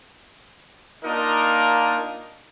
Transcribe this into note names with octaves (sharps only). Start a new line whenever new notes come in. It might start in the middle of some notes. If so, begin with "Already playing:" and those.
A#3 D4 D#4 F4 A#4